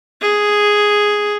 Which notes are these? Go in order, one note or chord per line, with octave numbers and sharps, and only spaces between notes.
G#4